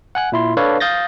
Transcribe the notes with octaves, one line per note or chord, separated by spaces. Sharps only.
F#5 G#5 F#6
A#2 E4 C6
D4 A4 B4 C#5 D5 F5
F5 D#6 G6 A6 A#6